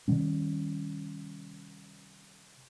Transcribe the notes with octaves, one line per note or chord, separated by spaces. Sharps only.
C3 D#3 G3 C#4